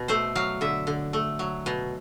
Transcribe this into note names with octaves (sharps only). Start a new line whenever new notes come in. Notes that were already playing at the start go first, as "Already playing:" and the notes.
Already playing: B2
A3 C5
F#3 F5
D3 E5
D3
A3
F#3
B2